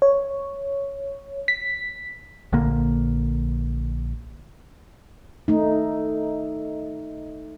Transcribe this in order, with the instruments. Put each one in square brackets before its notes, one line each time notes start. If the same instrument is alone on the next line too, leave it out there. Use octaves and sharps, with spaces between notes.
[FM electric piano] C#5
B6
[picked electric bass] A#1 D3 A#3
[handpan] A3 D#4